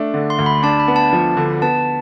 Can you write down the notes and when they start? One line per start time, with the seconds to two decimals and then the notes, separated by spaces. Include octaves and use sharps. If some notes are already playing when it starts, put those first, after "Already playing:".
Already playing: A3 D4
0.14 D3
0.30 C6
0.39 D2
0.46 B5
0.63 D4 A5
0.80 B5
0.88 B3
0.96 A5
1.13 F3
1.37 D3
1.62 B3 A5